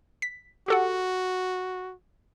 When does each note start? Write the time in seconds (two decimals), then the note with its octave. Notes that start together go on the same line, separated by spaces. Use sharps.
0.22 B6
0.68 F#4 G4 A4 F#5